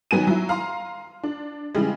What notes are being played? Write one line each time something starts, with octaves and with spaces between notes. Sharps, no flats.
D#3 F#3 B3 G#5 D#7
F#3 E4
F5 A#5 C6
D4
C#3 E3 G3 G#3